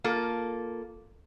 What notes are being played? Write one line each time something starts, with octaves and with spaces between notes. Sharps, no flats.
A#3 F4 A4